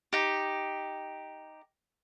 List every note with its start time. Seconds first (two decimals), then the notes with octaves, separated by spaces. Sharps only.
0.13 D#4 G4